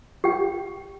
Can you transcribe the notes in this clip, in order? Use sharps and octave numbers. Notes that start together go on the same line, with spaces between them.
G4 G5